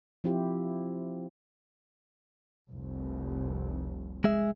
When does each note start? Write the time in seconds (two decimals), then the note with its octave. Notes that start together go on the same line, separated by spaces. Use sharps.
0.24 F3 C4 E4 F4 G4
2.70 F1 C2
4.24 G#3 G#4 E5